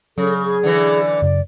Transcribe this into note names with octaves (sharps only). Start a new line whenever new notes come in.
C#3 F#3 A4
G#4
D3 E3
F#2 C#3 D5